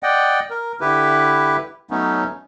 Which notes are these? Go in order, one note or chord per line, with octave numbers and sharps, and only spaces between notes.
D5 D#5 F#5 G5
A#4
D3 E4 G4 B4
F#3 A3 B3 C#4 D#4